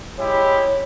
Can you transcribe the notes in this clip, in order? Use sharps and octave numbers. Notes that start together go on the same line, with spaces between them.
G#3 E4 G4 C#5